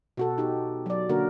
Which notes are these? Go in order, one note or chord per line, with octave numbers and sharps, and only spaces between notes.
B2 F#4 A4
D#4 G4
F#3 D5
D3 A#3 F#4 A#4